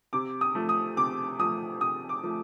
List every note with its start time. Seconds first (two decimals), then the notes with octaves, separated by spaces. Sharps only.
0.13 C3 D6
0.41 D#6
0.55 F3 A3
0.69 D#6
0.97 C3 D6
1.39 F3 A3 D#6
1.81 C3 D#6
2.09 D6
2.23 F3 A3